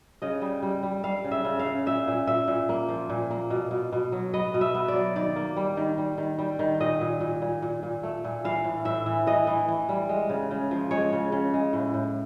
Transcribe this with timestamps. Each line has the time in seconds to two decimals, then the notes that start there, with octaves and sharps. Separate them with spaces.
0.22 C#3 D#5
0.42 G3
0.63 G3
0.83 G3
1.04 G3 F5
1.24 C#3
1.31 E5
1.44 C#3
1.59 F5
1.66 C#3
1.86 A#2 E5
2.07 A#2
2.27 A#2 E5
2.48 A#2
2.69 A#3
2.88 F3
3.09 A#2
3.31 A#3
3.50 B2
3.71 B2
3.92 B2
4.12 F#3
4.33 B3 D#5
4.54 B2
4.61 E5
4.75 B3
4.88 D5
4.94 F#3
5.16 D#3 D5
5.36 A#3
5.56 G3
5.77 D#3
5.98 G3
6.18 D#3
6.39 G3
6.59 D#3
6.80 A#2 D#5
7.01 A#2
7.20 A#2
7.42 A#2
7.62 A#2
7.83 A#2
8.03 A3
8.24 A#2
8.44 E3 F5
8.64 A2
8.85 A2 E5
9.06 E3
9.27 E3 D#5
9.47 E3
9.68 E3
9.89 G3
10.09 G#3
10.30 C#3
10.51 C#3
10.71 F3
10.91 G#3 C#5
11.12 C#3
11.32 C#3
11.54 G#3
11.73 A2
11.94 A2